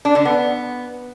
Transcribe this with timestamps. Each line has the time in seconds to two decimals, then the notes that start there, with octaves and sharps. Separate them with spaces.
0.05 D4
0.15 D3
0.25 B3